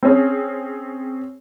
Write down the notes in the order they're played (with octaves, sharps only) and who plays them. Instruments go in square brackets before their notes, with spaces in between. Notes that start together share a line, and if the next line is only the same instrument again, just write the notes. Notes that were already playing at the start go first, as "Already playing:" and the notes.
[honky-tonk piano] C4 C#4 G#4